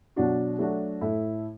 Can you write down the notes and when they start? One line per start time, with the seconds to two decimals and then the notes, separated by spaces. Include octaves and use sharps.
0.16 B2 F#3 D4 F#4
0.59 F#3 A3 D4 F#4
1.01 A2 A3 E4